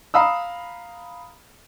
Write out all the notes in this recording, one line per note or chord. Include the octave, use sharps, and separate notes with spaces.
F5 A#5 B5 D#6 E6